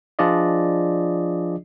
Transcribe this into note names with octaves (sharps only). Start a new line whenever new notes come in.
F3 D4 F4 G#4 D5 D#5